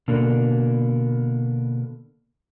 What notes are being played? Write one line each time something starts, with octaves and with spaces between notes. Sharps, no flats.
B2 D3 A#3 D4